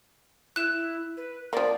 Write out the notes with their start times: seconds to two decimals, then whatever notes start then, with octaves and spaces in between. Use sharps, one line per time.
0.56 E4 F#6 E7
1.17 B4
1.53 F3 A#3 D5